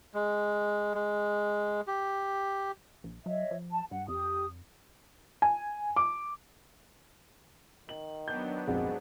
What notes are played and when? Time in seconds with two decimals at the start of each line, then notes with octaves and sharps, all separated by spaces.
0.14 G#3
0.95 G#3
1.87 G4
3.04 A#1
3.26 F#3 C#5 D#5 E5
3.51 F3
3.71 A5
3.91 G2 F#5
4.08 F2 G4 D#6
5.42 G#5
5.96 D6
7.89 D#3 F#7
8.28 F#3 B3 D4 G6
8.67 A#1 F2 G#2 D#3 C4